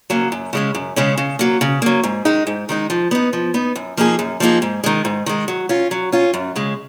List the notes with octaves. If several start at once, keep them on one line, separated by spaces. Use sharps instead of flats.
C#3 F#3 A#3
F#2
C#3 G#3 C#4
F#2
C#3 G#3 C#4
C#3
F#3 A#3
C#3
F#3 A#3
G#2
D#3 G#3 D#4
G#2
D#3 G#3 D#4
F3
B3 D#4
F3
B3 D#4
F#2
F3 A#3 D#4 G#4
F#2
F3 A#3 D#4 G#4
G#2
D#3 G#3
G#2
D#3 G#3
F#3
C#4 F4
F#3
C#4 F4
F#2
C#3 G#3